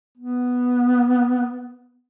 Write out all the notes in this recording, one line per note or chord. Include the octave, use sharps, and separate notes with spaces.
B3